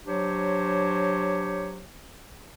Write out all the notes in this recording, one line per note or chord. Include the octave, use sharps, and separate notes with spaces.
F#3 D4 G4 C5 C#5